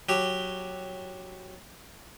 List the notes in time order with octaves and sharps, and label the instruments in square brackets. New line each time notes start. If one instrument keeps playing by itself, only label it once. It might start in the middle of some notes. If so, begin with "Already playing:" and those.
[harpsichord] F#3 G4